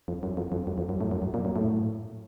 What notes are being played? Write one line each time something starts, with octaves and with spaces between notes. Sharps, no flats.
F2
F#2
F2
F2
F#2
F2
F#2
A2
F#2
F#2
A#2
F#2
A2